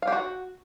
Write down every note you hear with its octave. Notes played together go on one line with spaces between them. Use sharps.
F5
G4
F#4